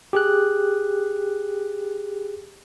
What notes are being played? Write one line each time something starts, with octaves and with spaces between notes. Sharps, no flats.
G4 G#4 F#6